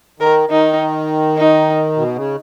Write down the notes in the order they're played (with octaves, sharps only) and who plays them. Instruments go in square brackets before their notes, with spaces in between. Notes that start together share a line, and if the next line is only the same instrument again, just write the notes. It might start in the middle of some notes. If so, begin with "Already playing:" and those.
[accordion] D#3 [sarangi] A#4
[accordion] D#3 [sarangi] D#4
[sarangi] D#4
[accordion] B2
C#3